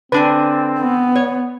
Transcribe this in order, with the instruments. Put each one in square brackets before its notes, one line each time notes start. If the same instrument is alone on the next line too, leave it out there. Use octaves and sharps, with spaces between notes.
[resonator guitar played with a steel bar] D3 D4 G#5 [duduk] C4 [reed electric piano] B4
[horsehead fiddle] B3
[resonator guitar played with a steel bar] C#5